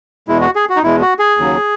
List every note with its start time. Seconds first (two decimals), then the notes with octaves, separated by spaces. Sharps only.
0.28 E2 B2 G#3 E4
0.41 F#4
0.55 G#4
0.69 F#4
0.76 D#4
0.83 E2 B2 G#3 E4
1.01 F#4
1.19 G#4
1.37 D#2 C#3 F#3